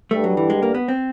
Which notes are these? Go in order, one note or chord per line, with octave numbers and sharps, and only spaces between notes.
G2 D3 G3 A3
F#3
E3
G#3
A#3
B3
C4